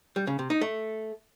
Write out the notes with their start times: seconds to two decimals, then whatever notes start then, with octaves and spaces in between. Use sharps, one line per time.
0.16 G3
0.27 C#3
0.39 C3
0.50 D#4
0.61 A3